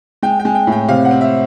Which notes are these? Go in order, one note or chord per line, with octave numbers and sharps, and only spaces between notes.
G#3 G5
G5
G#3
G5
A2 G5
C3 F5
F#5
C4
E5